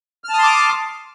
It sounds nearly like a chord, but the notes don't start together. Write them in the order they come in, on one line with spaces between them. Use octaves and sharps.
F6 A5 D#6 C6 D6